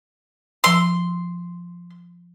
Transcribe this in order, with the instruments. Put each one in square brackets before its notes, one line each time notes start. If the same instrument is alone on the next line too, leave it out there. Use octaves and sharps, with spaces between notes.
[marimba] F3 E6 [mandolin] C6